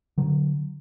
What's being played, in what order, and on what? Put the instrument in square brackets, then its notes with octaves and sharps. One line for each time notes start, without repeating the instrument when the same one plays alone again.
[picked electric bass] D3 F#3